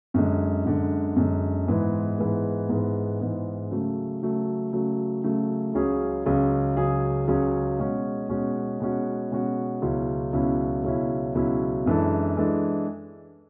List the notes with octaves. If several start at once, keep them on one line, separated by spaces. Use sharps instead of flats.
F#2 D3 G#3
F#2 D3 G#3
F#2 D3 G#3
G#2 E3 G#3 B3
G#2 E3 G#3 B3
G#2 E3 G#3 B3
G#2 E3 G#3 B3
C#3 F#3 A3
C#3 F#3 A3
C#3 F#3 A3
C#3 F#3 A3
C#2 C#3 F#3 C#4 G#4
C#2 C#3 F#3 C#4 G#4
C#2 C#3 F#3 C#4 G#4
C#2 C#3 F#3 C#4 G#4
B2 G#3 C#4 F#4
B2 G#3 C#4 F#4
B2 G#3 C#4 F#4
B2 G#3 C#4 F#4
C#2 B2 F#3 C#4 E4
C#2 B2 F#3 C#4 E4
C#2 B2 F#3 C#4 E4
C#2 B2 F#3 C#4 E4
F#2 E3 G#3 D4 A4
E3 G#3 D4 A4